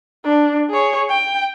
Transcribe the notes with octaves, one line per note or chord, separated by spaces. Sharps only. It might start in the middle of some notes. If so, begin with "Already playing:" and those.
D4
G#4 C#5
G5